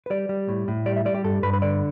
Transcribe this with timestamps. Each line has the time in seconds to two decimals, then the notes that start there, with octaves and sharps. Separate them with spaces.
0.06 B4
0.10 G3 D5
0.29 G3
0.49 A2
0.68 A2
0.86 G3 D5
0.96 E5
1.05 G3 D5
1.15 G4
1.24 G2 A4
1.43 G2 B4
1.53 B4
1.62 D3 D5